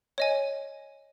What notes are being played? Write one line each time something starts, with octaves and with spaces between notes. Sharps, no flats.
C#5 D#5 G#5